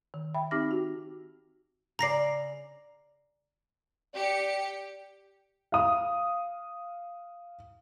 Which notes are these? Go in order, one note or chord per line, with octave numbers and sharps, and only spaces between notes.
D#3
E5 G5 B5
C4 D#4 G4 D6 F6 A#6
F#4
C#3 D5 A#5 A#6 C7
G4 D5 C#7
F5 D#6